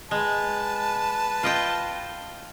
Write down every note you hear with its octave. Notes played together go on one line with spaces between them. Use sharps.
G#3 B4 A5
F4 D#5 G5